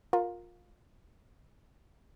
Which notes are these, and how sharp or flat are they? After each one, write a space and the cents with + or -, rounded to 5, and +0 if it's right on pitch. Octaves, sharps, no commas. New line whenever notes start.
F4 +20 A#4 +0